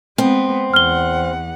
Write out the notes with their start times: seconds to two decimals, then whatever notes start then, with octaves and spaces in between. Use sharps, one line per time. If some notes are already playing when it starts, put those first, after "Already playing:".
0.18 G#3 B3 C4
0.74 E2 F#5 F6 G7